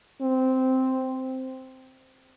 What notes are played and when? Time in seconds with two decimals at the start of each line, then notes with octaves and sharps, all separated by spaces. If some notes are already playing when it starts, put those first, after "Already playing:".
0.22 C4